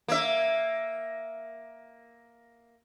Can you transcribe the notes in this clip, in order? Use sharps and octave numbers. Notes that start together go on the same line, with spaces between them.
A#3 E5